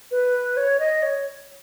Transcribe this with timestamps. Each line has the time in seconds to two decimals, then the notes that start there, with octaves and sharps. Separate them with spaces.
0.11 B4
0.57 C#5
0.80 D#5
1.02 C#5